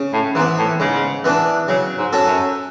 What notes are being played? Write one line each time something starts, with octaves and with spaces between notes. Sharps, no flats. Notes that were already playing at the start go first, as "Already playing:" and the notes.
Already playing: C#3
A2
G#2 E3 B3
A2
G#2 C#3
E3 B3 D4
C#3 F#3
G#2
C#4 F#4 A4
F#2